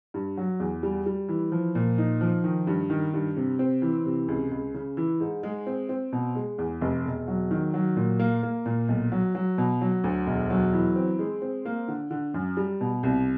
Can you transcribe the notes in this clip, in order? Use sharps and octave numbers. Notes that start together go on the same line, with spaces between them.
G2
F#3
E2
G3
G3
E3
F3
A#2
D#4
F3
D#3
G2
D#3
G2
C3
C4
E3
C3
C#2
C#2
C#3
E3
G#2
G#3
C4
C4
B2
G#3
E2
F1
E1
F#3
D#3
F#3
A#2
A#3
A#3
A#2
B1
F#3
F#3
B2
F#3
D2
E1
F#3
E3
C4
G#3
C4
A#3
D3
D3
F#2
G3
B2
C2